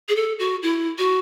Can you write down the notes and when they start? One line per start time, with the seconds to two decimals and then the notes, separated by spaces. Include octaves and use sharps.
0.08 G#4
0.15 A4
0.39 F#4
0.62 E4
0.98 F#4